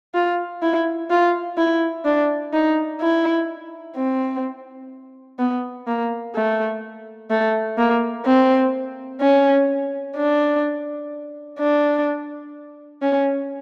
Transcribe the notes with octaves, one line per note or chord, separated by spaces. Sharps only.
F4
E4
F4
E4
D4
D#4
E4
C4
B3
A#3
A3
A3
A#3
C4
C#4
D4
D4
C#4